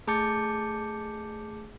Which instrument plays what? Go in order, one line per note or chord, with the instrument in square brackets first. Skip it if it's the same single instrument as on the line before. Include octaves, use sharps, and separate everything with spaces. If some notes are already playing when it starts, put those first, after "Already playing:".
[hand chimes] A3 G#4 A5 D6 G6 C#7